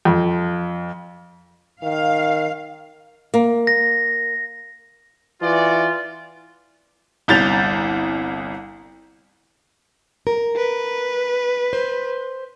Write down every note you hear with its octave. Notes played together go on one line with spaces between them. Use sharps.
F2
D#3 F5
A#3
A#6
E3 F4 F#4 D5
G1 C2 G6 A6 F7
A#4
B4
C5